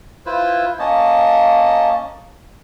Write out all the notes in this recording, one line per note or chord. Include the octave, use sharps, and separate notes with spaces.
E4 F4 B4 C5
A#3 C#4 D#5 A5